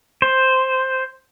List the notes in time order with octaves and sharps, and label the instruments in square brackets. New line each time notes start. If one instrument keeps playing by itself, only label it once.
[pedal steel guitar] C5